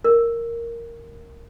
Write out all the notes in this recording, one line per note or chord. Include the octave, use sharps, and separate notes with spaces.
A#4